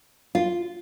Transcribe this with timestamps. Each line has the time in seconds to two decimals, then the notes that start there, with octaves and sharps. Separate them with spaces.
0.35 F4